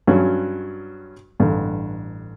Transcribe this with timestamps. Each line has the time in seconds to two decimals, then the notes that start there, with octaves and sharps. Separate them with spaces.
0.07 G2 F#3 C#4 F#4
1.39 A1 G2 D3